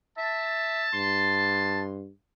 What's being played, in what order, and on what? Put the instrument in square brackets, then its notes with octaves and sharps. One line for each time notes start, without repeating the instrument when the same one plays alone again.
[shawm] E5 [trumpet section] A5
[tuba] G2 [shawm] C6